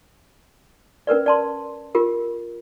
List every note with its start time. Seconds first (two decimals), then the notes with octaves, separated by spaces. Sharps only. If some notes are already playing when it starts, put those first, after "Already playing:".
1.07 C#4 A#4 B4 D5
1.26 D5 A5 C6
1.95 F4 G4 A#4